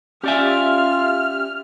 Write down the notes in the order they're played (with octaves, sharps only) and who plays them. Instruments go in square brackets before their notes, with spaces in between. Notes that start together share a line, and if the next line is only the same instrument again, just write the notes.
[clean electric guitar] C#4 D5 G#5 [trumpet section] F4 [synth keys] G4 E5 [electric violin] F6